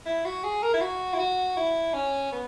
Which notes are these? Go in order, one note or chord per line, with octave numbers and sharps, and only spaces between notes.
E4
F#4
G#4
A#4
E4
F#4
E4
F#4
E4
C#4
B3